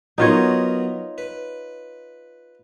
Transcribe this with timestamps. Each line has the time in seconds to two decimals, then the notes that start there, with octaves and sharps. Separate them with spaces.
0.18 F#3 B3 D#4 F4 A#4 C#5
1.18 B4